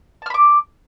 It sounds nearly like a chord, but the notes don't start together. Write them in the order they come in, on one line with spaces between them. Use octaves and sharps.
A5 F6 B5 D6